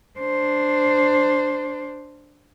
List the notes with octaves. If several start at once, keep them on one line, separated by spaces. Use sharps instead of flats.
D4 C5